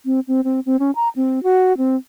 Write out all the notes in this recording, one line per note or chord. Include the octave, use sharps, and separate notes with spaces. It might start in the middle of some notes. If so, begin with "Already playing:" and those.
C4
C4
C4
C4
C#4
A#5
C4
F#4
C4